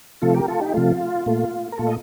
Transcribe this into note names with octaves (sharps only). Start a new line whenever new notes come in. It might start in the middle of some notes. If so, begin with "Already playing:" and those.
C3 F3 A3 F4 A4
G4 A#4
F4 A4
D#4 G4
C3 F3 A3 F4
A#2 A3
A#4
A#2 A3 F4 A4
D#5